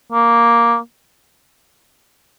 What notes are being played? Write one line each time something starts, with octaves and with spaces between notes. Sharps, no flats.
A#3